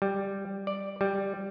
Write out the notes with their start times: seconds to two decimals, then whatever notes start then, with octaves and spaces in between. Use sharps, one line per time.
0.02 G3
0.67 D5
1.01 G3